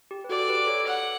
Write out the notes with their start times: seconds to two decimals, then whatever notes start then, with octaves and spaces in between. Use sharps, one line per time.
0.11 G4
0.24 B4
0.29 F#4 A4 D5
0.49 G4 B4
0.67 A4 C#5
0.86 F#5